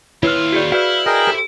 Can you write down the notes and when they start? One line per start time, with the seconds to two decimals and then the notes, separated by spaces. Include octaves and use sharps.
0.23 D#2 E4 F4 B4 C#5 F6
0.52 F#4 G#4 D5
0.72 E4 F#4 B4 D5 F5 F6
1.06 G#4 A#4 D#5 G5
1.27 G4 A4 C5